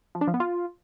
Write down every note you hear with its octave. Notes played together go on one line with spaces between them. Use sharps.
F3
D4
F3
B3
F4